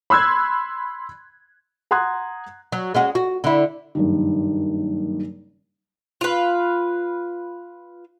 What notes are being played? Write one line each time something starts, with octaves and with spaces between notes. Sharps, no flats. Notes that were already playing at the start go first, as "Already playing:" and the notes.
B5 C6 E6 F#6 G#6
F#5 A#5 C6 D#6 F#6 G#6
F#3
G#3 C#4 F#4
F#4
D3 E4
F#1 G2 D#3
F4 B4